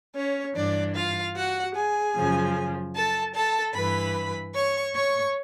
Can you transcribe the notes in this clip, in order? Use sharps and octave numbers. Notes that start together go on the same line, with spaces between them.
C#4 C#5
G2 E3 D4 D5
F4 F5
F#4 F#5
G#4 G#5
F#2 C#3 F3
A4 A5
A4 A5
G2 E3 B4 B5
C#5 C#6
C#5 C#6